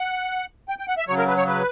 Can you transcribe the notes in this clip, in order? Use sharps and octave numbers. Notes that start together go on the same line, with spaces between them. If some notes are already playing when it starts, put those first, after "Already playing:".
Already playing: F#5
G5
G5
F#5
E5
C#3 F#3 C#5
A#4
B4
C#5
B4